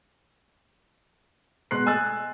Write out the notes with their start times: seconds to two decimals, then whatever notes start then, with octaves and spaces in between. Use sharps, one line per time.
1.71 B2 G#3 C6 F#6 C7
1.86 D#5 G#5 E6 F#6 A6